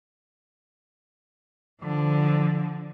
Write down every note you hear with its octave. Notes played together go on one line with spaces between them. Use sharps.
D3 F3